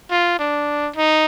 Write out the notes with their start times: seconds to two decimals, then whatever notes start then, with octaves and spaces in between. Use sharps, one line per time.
0.11 F4
0.39 D4
0.96 D#4